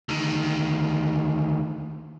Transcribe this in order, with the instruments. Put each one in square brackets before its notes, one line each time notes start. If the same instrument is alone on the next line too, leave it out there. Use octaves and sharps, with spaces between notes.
[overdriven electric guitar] D2 D#3